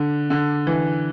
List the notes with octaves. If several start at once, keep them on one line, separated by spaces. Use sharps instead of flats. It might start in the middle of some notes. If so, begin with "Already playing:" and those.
Already playing: D3
D3
E3